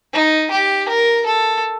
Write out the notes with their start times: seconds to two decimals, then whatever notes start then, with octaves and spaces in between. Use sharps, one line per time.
0.13 D#4
0.51 G4
0.89 A#4
1.26 A4